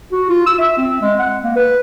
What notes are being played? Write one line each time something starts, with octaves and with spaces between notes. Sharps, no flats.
F#4
F4
E6
E5
C4
G#3
F#5
A#3
B4